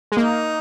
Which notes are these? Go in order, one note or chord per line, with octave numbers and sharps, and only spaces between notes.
G#3
A#3 D#4